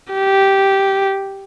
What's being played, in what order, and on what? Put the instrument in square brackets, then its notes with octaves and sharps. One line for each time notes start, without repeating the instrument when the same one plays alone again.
[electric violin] G4